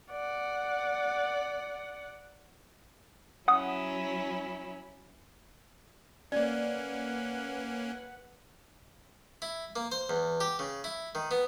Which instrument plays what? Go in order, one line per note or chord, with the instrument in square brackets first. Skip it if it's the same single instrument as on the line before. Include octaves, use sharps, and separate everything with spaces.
[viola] D5 F#5
[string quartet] F#3 C#4 E4 [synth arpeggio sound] F#5 D#6
[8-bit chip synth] A#3 C#4 [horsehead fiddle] B4 F#5 [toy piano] D5
[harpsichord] E4
A#3
C5
E2
G4
C#3
E4
D#3
B3